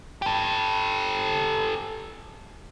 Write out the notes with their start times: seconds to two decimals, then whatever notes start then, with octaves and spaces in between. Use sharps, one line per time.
0.22 G4 A4